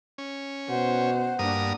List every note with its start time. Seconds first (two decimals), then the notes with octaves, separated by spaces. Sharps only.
0.18 C#4
0.70 B2 C5 F#5
1.39 G2 A#3 D4 A#4 D#6